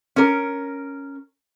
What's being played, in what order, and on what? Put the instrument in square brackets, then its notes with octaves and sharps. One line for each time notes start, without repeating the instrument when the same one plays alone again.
[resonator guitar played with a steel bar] C#4 A#4